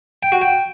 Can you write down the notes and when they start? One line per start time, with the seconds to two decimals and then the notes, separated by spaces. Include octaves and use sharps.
0.23 G5
0.32 F#4
0.42 G5